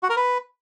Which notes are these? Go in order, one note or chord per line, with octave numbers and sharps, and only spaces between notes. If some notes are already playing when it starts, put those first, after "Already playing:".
F#4
A#4
B4